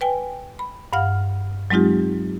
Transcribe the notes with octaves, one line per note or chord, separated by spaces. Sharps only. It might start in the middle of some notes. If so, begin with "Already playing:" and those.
B4 G5 G#5
B5
G2 F5 F#5 F6
F#3 G#3 C4 D#4 F4 G4